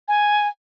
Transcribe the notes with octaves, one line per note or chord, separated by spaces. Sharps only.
G#5